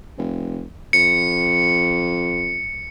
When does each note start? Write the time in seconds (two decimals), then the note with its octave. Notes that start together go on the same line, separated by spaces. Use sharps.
0.18 F1
0.93 F2 C#7